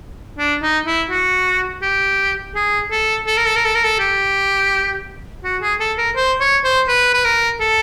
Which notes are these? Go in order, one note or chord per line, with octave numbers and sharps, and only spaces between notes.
D4
D#4
E4
F#4
G4
G#4
A4
A4
A#4
A4
A#4
A4
A#4
A4
G4
F#4
G#4
A4
A#4
C5
C#5
C5
B4
B4
A#4
A4